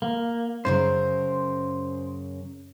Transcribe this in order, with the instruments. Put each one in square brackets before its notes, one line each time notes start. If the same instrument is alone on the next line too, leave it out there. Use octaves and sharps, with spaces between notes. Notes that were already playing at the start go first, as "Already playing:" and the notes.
[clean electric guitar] A#3
[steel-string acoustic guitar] F#2 C#3 A#4 [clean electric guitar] C5